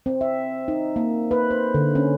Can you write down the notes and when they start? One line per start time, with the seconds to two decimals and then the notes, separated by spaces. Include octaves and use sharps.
0.06 C4
0.21 E5
0.68 D#4
0.96 A#3
1.31 B4
1.51 C5
1.74 D3
1.95 C#4